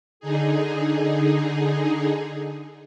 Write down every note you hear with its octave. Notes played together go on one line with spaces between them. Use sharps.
D3 D#4 G#4